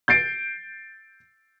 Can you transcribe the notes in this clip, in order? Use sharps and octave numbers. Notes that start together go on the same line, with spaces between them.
G6 A6 C7 D7